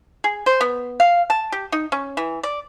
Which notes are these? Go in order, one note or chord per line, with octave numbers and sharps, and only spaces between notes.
G#4
C5
B3
F5
A5
G4
D#4
C#4
E3
D5